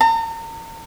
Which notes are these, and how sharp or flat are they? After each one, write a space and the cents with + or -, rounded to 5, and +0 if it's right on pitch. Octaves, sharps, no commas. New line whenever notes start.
A#5 -40